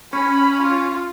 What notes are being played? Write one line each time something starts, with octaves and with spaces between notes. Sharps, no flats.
C#4 B5
F4